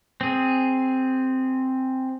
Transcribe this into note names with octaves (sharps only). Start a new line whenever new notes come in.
C4 G#4